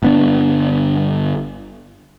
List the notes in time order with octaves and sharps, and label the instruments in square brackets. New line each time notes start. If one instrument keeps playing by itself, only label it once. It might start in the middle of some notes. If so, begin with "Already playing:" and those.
[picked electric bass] G1 B3 D4